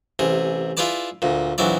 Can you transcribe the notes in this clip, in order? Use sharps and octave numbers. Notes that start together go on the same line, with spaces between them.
A1 C3 G#4
E4 F4 G#4 B4 D5 A5
D2 A#2
A#1 E2 F#3 E4 D5